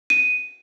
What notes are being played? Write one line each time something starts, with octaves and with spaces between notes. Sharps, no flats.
D#7